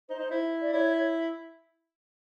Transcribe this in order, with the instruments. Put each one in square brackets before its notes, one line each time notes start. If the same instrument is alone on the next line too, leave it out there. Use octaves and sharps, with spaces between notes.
[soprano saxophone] D#4 [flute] C5
[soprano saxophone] D#4
E4
[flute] D5
[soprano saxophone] E4 [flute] C#5